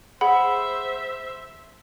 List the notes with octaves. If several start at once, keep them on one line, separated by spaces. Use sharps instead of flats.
G#4 C5 E5 F#5 B5